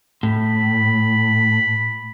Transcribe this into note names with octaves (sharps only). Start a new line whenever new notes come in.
A2 B5